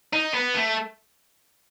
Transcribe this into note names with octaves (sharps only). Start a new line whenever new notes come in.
D#4
B3
A3